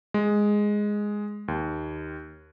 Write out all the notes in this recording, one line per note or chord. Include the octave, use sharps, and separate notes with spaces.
G#3
D#2